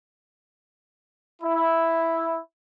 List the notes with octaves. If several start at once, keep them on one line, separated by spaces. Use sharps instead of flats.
E4